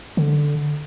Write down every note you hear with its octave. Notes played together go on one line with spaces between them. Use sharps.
D3